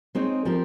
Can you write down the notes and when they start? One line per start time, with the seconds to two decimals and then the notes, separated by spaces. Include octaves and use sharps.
0.15 G#3 C4 D#4 G#4 C#5
0.45 F3 C4 G4 A#4